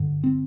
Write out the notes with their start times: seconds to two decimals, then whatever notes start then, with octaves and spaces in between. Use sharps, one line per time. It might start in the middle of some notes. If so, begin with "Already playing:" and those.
Already playing: G2 D3
0.24 C4